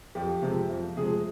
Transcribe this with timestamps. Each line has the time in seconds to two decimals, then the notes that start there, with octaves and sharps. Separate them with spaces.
0.15 F2 G4
0.42 C3 F3 G#3
0.70 F2
0.96 C3 F3 G#3 G#4